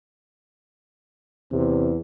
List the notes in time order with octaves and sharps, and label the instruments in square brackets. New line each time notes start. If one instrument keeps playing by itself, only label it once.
[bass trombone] E2 [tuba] C3